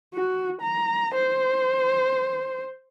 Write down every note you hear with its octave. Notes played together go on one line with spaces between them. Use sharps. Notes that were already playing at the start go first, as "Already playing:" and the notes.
F#4
A#5
C5